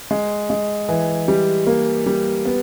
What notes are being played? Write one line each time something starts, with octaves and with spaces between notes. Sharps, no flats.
G#3
G#3
E3
G3
A#3
G3
B3